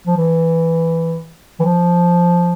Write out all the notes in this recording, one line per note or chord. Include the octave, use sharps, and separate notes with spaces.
F3
E3
E3
F3